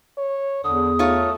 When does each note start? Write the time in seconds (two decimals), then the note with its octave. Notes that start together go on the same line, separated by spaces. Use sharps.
0.18 C#5
0.64 E2 D3 D#6
0.99 A3 D#4 F4 C#5